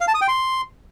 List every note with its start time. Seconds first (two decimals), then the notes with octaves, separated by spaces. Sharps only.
0.01 F5
0.08 A5
0.14 D#6
0.21 G5
0.28 C6